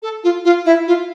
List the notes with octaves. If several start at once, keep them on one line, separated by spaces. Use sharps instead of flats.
A4
F4
F4
E4
F4